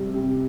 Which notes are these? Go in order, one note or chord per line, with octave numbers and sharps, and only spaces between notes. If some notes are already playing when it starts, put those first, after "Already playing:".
Already playing: C3 G3
C3